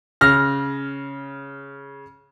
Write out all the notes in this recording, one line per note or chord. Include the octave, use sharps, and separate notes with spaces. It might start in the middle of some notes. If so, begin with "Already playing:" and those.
C#3 F6 A#6